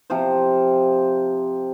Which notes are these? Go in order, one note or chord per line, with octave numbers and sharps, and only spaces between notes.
C3 F3 C5